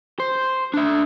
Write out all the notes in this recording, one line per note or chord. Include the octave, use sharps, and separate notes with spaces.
C5
D4 E5